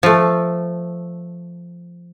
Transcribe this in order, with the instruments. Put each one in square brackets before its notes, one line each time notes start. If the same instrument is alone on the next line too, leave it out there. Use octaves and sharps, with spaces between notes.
[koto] F3 A3